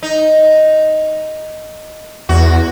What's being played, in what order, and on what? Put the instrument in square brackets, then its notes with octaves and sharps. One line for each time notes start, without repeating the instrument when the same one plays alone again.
[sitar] D#4
[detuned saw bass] E2 [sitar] F#4